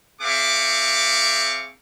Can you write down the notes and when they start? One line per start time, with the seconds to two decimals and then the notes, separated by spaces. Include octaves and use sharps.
0.21 C4 G#4 E5 F5 C#6 D6